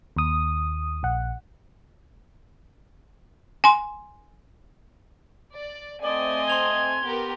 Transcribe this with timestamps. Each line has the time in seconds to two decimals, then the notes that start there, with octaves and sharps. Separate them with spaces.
0.16 D#2 D#6
1.03 A#1 F#5
3.64 G#5 C6
5.54 D5
6.03 A3 C4 D5 D#5 G#5
6.47 C6 G#6 F7 G7
7.03 B3 G4 A#4 G7